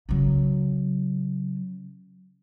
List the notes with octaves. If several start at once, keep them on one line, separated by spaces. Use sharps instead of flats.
C#3 F#3